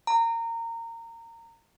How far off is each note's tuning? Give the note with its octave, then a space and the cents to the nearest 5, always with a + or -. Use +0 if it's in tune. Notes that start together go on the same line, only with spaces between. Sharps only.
A#5 -25